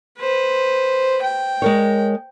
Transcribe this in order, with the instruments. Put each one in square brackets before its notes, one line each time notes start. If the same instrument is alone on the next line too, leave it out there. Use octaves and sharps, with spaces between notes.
[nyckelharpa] B4 C5
G5
[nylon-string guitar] G#3 A#4 C#5